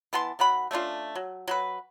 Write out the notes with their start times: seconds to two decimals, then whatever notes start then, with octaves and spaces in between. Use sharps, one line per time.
0.13 E3 B3 A5 C6
0.39 D#3 F#3 F#5 B5
0.71 A3 C#4 D4 F4
1.15 F#3
1.47 F#3 F#4 B4